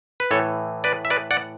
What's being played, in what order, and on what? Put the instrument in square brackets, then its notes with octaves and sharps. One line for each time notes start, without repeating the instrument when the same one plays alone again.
[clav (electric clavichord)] B4
A2 E3 A4 C#5
B4 D5
E5
B4 D5
D5 F#5